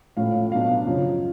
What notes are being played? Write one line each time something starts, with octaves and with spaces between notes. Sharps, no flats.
A2 F3 A3 C#4 F5
B2 F#3 B3 D4 F5
F#2 C#3 F3